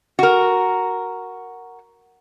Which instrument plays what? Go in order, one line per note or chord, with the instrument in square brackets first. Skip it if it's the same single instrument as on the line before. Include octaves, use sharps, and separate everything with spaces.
[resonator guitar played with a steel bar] F#4 A#4